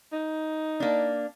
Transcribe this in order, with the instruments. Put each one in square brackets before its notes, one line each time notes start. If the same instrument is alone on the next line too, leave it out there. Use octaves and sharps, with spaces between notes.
[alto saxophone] D#4
[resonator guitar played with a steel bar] A#3 D4